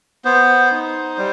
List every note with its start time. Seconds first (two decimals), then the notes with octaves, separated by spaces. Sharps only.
0.25 B3 C5
0.71 D#4
1.18 G3